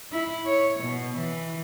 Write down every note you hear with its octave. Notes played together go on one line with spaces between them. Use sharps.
E4
C#5
B2
E3